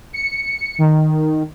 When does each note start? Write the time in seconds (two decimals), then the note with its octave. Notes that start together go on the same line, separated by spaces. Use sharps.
0.13 C#7
0.78 D#3